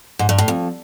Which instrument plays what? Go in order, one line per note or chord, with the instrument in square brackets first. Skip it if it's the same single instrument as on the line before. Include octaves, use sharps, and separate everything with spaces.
[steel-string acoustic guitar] G#2
G2
A2
F2